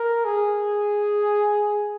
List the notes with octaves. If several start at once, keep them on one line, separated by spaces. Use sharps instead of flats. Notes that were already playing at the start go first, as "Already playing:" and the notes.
Already playing: A#4
G#4